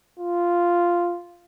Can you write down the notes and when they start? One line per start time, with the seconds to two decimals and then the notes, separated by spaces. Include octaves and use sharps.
0.20 F4